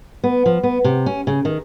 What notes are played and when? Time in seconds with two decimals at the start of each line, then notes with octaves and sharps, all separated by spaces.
0.24 B3
0.46 F3
0.63 B3
0.84 C3
1.06 C#4
1.27 C#3
1.45 D#3